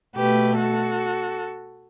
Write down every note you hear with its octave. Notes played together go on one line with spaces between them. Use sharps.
B2 A3 G4 B4
F#4 A4